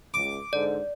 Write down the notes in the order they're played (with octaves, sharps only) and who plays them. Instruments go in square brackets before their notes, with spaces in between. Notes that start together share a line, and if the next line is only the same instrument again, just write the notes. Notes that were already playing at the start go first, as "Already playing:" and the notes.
[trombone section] C#2 [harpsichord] D6
[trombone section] G#2 D3 [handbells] D5